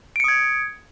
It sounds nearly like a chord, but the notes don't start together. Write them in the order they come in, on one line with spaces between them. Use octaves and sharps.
D7 C#7 D#6 G#6